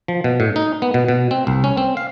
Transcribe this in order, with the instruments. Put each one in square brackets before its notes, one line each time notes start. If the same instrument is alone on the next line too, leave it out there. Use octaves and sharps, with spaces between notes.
[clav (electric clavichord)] F3
B2
A2
D#4
B3
B2
B2
C4
C2
C#4
C4
F5